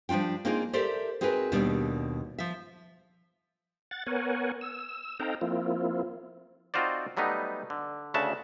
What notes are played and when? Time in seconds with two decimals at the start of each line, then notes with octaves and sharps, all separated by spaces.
0.09 F3 G3 D4 F4 G5
0.45 A#3 C4 D4 D#4 F4 G#4
0.73 G4 A4 A#4 C5 D5 E5
1.21 C4 D#4 F#4 G#4 A#4 B4
1.52 D#2 B2 G3 D4
2.39 F3 E5
3.91 F#5 A6
4.06 B3 A#4 C#5 F#5 G#5
4.61 E6
5.20 C4 D#4 A4 F5 G5 A#5
5.41 F3 A#3 C4 E4 F4
6.74 C4 D#4 F4 F#4 C5 D5
7.17 F#3 G3 A3 B3 D#4
7.70 D3
8.14 D2 C#3 F#4 E5 A5